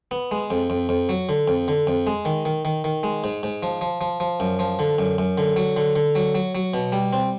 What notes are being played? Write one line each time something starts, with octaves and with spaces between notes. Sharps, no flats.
B3
G#3
F2
F2
F2
F#3
D3
F2
D3
F2
G#3
D#3
D#3
D#3
D#3
G#3
G#2
G#2
F3
F3
F3
F3
F#2
F3
D3
F#2
F#2
D3
F#3
D3
D3
F#3
F#3
F#3
B2
G3
C4